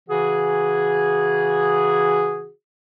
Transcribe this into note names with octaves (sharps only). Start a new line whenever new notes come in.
C#3 E3 F#4 G#4